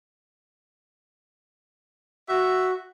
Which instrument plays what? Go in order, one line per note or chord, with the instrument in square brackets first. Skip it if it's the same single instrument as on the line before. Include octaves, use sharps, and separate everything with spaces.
[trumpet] F#4 [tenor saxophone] E5